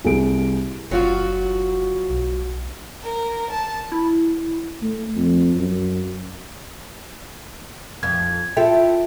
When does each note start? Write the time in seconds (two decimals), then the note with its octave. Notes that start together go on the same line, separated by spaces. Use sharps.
0.05 C2 G#4 D7
0.91 F#1 F#3 F4 F#4
2.10 B1
3.02 A#4
3.51 A5
3.92 E4
4.83 A3
5.16 F2
5.57 F#2
8.03 F2 G#6
8.57 E4 F4 A4 E5 G5